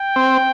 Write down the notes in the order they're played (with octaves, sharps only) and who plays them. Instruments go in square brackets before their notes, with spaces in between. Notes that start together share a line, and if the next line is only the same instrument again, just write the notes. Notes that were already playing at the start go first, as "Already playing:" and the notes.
Already playing: [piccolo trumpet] G5
[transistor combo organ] C4